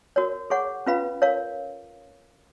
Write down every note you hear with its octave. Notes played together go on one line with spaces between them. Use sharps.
F#4 A#4 C#5
G#4 C#5 F#5 C#6
C#4 F4 B4 F5 B5
A#4 C#5 F5